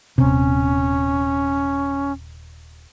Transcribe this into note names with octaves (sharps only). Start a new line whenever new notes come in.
D#1 C3 C#4